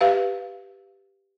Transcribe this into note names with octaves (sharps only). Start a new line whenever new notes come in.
G4 B4 E5 F5